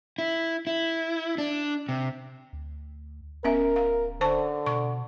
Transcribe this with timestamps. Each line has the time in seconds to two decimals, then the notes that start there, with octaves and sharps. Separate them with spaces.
0.18 E4
0.67 E4
1.38 D4
1.89 C3
2.53 D2
3.44 D1 B3 C#4 A#4 E5
3.76 F5
4.21 D3 C5 A5 C#6
4.66 B2 C#6